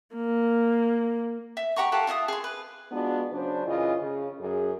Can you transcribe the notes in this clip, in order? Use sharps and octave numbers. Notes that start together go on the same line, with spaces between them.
A#3
E5
G4 F#5 A#5 C#6
F4 G4 A4 F#5
F4 E5 G#5 D#6
G#4 C6
B4
G#3 B3 D4 F4 F#4
C#3 F#3 D4 B4 C5
F#2 C#3 E3 F4 D#5
C#3
F#2 G#4